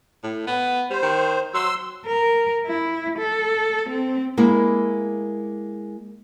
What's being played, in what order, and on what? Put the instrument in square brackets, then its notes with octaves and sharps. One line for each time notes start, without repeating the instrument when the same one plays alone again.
[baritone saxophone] A2
B3
[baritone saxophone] G3 [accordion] C5
[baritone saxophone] D#3
[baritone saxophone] F#3 [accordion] C6 E6
[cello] A#4
E4
A4
C4
[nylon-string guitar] G#3 A#3 E4